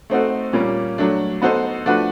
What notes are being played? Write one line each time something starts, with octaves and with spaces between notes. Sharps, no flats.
A3 C4 D#4 F#4 A4
A#2 G3 A#3 C#4
F#3 A3 D4
B3 D#4 F#4 A4 C5
F3 A3 D4 F#4 B4